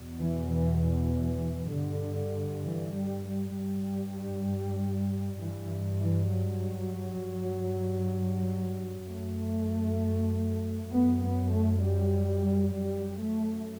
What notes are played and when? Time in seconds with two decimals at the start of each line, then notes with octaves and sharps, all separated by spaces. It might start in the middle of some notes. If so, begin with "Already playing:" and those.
Already playing: E2 B2
0.20 E3
0.50 E3
0.81 E3
1.72 G2 D3
2.64 E3
2.95 G3
3.26 G3
3.56 G2 G3
5.39 G2 E3
6.01 E3
6.32 F#3
7.23 G2
9.07 F#2 A3
10.91 F#2 B3
11.22 B3
11.52 A3
11.82 G3
12.74 F#2 G3
13.20 A3